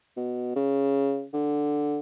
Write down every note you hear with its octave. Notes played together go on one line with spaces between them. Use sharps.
B2
C#3
D3